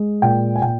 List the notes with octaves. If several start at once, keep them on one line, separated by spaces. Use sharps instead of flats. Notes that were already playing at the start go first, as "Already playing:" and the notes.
Already playing: G#3
A#2 G5
G#5
A#2 G5